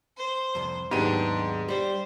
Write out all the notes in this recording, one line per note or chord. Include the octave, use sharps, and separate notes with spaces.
C5
C2 F2
D#2 G#2 F#3 B3 D4 G4 D#7
G3 G4 C5